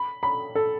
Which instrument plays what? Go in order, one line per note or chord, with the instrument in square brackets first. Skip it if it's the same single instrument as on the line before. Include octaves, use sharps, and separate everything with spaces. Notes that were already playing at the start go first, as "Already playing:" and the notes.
Already playing: [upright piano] B5
B5
A4